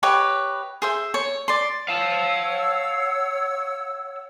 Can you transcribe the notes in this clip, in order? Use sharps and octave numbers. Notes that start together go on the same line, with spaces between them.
G4 B4 C#5 D#5
G#4 C5 E5
C#5
D5 C6
C#5 F5 F#5 A5 E6